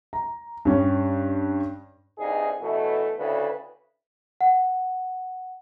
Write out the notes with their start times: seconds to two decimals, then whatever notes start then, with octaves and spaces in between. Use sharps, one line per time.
0.13 A#5
0.65 G2 C#4 G4
2.19 C2 G2 D#4 G#4
2.61 A1 B2 E3 A3
3.18 D2 A2 C#3 B4
4.41 F#5